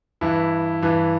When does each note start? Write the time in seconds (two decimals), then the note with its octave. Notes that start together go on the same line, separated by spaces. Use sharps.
0.21 G2 E3 E4
0.82 G2 E3